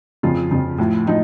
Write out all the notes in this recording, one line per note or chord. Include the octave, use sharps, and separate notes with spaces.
F2 C#3 F3 F4
F2 C#3 F3
A2 F3
A2 F3 D#4